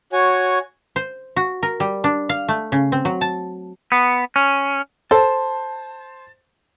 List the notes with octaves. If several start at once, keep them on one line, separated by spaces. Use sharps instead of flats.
F#4 C#5 G#5
C5
F#4
A#4
G3
D4
F5
A3
C#3
C4
F#3
A5
B3
C#4
A4 C5 A5